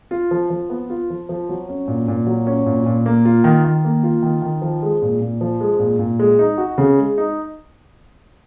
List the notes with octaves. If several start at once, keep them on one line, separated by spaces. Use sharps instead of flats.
F4
F3
F3
B3
F4
F3
F3
F#3
C#4
A#2
A#2
F#3
C#4
A#2
A#2
A#3
F4
D#3
D#3
A#3
F4
D#3
D#3
F3
G#3
A#2
A#2
F3
G#3
A#2
A#2
G#3
D#4
F#4
C#3
G#3
D#4